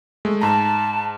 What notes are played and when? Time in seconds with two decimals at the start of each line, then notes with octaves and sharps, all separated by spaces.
0.25 G#3 A3
0.42 G#2 A5 A#5